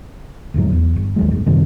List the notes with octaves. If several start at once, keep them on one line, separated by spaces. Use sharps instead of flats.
E1 D2 G#2 F#3
E2
G1
D#2 F#3 G#3
G1 G#2
F#2 C3 D#3 G3